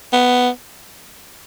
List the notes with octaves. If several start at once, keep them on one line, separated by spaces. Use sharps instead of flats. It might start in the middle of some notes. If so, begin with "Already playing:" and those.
B3